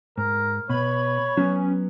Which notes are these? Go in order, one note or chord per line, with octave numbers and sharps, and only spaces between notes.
G#2 A#4
B2 B3 C#5 B5
F#3 B3 C#4